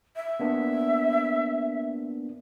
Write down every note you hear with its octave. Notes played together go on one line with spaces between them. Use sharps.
E5
A#3 B3 D4